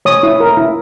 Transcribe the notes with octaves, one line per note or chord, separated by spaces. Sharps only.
C#5 D#6
E4
A#4
E4